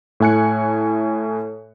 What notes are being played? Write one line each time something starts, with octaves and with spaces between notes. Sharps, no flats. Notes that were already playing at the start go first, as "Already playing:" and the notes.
A2 A3 G#5 F#6 C#7